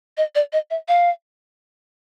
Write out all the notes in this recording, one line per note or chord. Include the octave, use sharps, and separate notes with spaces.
D#5
D5
D#5
E5
F5